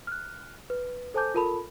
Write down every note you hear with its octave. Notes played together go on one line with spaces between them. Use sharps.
F6 F#6
B4
A4 C5 G#5 A5 D6 G6
F4 A4 A#4 A5 B5